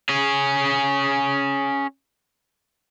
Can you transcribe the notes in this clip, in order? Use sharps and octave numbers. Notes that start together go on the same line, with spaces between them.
C#4 G#4